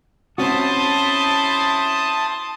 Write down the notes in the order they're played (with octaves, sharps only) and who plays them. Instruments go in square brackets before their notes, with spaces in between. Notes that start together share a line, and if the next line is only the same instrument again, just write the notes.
[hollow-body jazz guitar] C4 C#4 F#4 [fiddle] E4 C5 [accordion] A5 D#6